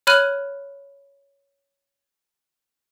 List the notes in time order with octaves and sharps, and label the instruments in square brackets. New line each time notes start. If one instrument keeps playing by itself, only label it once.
[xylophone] C#5 B5 F6 F#6 D#7 F#7